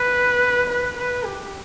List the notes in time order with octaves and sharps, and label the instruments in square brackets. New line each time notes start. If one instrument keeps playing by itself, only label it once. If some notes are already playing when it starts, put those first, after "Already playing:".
Already playing: [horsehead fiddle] B4
B4
B4
G4